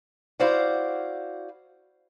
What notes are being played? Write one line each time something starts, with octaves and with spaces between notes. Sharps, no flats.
E4 F#4 C5 D5 F5 F#5